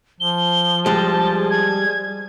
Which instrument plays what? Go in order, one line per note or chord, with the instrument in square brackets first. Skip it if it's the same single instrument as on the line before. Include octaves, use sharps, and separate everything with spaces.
[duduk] F3 [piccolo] G7
[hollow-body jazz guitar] G3 G#3 [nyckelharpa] G#4 [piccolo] A5
[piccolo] G#6